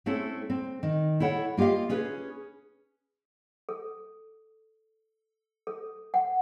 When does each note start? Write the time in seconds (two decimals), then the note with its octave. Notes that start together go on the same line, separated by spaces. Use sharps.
0.06 A3 C4 C#4 E4 A4
0.50 C4
0.83 D#3
1.20 E4 A4 C#5 F#5
1.57 A#3 F4 G4 D#5 F5
1.89 C#4 G#4 B4
3.69 A4
5.67 A4
6.14 F#5